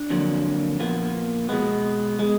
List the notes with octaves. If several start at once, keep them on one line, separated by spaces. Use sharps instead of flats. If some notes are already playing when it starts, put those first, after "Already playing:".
Already playing: D4
F2 D3 F#3 A#3
A#2 F3 A#3 B3
B2 G#3 B3
G#3